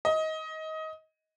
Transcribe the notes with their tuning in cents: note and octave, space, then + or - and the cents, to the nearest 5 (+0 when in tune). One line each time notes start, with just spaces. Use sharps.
D#5 +20